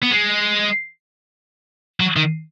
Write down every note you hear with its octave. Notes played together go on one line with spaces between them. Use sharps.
B3
G#3
F#3
D#3